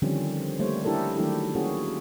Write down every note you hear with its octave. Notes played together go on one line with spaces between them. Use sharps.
D3 D#3 F3 G3 C4 C#4
G3 A3 A#3 C5 C#5
D4 E4 G4 A4 A#4
D#3 F#3 A3 D4 E4 G4
A#3 C#4 E4 F#4 G#4